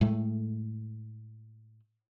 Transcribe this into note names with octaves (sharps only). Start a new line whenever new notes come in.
A2 G#3 A3